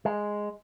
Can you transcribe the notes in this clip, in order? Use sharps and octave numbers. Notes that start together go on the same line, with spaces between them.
G#3